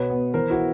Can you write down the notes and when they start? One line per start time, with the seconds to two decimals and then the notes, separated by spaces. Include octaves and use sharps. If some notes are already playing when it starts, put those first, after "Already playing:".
Already playing: B2 B4 C#5
0.10 B3
0.34 E3 A#4 C5
0.50 E4 F#4
0.58 B3